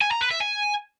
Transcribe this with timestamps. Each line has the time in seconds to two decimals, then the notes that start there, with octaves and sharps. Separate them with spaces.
0.01 G#5
0.11 A#5
0.21 B4
0.31 E5
0.41 G#5